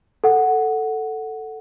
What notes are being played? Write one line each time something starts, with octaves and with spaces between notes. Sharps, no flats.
A4 F#5